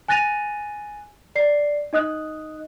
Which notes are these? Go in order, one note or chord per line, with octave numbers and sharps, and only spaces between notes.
G#5 F#6 A6 A#6 D#7 F7
D5 C7
D#4 D#5 D#6 F#6